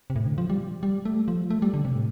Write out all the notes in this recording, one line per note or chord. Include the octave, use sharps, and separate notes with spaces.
C3
A2
D3
F3
G3
G3
A3
F3
A3
G3
D3
C3
A2